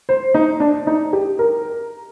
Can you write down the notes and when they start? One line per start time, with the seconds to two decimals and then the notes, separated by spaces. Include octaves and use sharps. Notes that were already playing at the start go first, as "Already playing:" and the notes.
0.09 C5
0.34 D#4
0.60 D4
0.87 D#4
1.13 G4
1.39 A#4